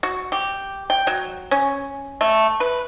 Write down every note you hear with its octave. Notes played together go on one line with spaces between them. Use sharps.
F#4
G4
G5
F#3
C#4
A3
B4